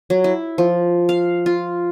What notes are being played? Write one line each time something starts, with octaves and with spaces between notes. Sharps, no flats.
F#3
E4
F3
F5
F4